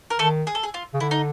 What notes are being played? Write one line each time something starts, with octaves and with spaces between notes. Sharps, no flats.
A#4
D#3 A3 A4
G#4
A4
G#4
F4
C#3
D3 E4
D#4